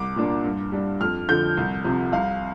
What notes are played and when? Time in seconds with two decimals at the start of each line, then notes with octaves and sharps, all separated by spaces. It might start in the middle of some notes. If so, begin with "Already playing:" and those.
Already playing: C2 D6
0.16 A#2 A#3 D4
0.44 G2
0.72 G3 D4
1.01 F2 F6
1.29 D3 F3 G6
1.57 C2
1.84 C3 F3
2.12 C2 F5